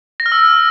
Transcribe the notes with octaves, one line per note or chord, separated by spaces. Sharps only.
A#6
F6
E6